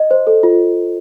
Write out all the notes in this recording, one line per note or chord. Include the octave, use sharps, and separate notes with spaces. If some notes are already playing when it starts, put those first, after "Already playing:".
Already playing: D#5
C5
A4
F4